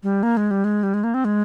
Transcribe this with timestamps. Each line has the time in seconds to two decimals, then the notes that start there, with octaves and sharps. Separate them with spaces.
0.03 G3
0.23 A#3
0.37 G#3
0.51 G3
0.64 G#3
0.83 G3
0.94 G#3
1.04 A#3
1.14 C4
1.25 G#3